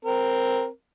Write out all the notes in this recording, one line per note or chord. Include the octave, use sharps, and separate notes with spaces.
C4 A#4